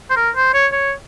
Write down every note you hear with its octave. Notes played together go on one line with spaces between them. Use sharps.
C5
A#4
C5
C#5
C#5